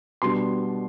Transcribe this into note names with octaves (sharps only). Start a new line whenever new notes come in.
B2 G3 B3 D4 C6